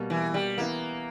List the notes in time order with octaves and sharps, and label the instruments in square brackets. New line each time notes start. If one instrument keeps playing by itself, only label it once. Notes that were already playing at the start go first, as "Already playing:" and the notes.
Already playing: [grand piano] B2 G3 A#3
[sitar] E3
G3
[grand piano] E3 B3 E4 [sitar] A#3